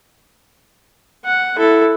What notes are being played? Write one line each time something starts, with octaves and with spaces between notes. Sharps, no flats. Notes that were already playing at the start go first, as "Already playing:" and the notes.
F#5
E4 A4